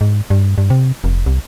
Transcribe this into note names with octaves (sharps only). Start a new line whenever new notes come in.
G#2
G2
G2
C3
F1
C2